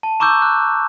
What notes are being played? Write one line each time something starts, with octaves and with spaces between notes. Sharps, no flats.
A5
A#5 C#6 D6 E6 G6
F#6